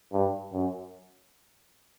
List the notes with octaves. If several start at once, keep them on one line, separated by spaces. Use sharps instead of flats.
G2
F#2